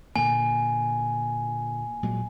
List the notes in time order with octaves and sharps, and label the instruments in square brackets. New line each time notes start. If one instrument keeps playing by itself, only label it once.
[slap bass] A#2 D3 A#3 [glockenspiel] G#5
[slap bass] A#2 F#3 G#3